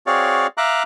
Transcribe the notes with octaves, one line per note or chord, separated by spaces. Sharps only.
C4 F#4 G#4 C#5 D5 F5
E5 F5 A#5 D6 F#6